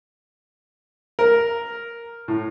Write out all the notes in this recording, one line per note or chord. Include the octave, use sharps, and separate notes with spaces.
A#4
A2